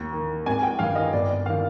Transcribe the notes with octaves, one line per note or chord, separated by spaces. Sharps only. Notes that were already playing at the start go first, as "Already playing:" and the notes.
Already playing: D#2
D#3
G#1 G#5
G5
G2 D#3 F5
D#5
G1 D5
D#3 F5